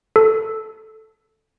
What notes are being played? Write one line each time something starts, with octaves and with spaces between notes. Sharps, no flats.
A4